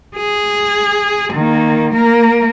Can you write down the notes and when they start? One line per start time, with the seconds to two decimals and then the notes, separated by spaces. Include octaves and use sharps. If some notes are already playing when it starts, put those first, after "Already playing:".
0.17 G#4
1.33 D#3 A#3
1.94 A#3 A#4